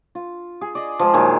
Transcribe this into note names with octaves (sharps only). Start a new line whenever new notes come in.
F4
G#4
D5 D#5
F3 G#3
A#2 D#3 F#3 G#3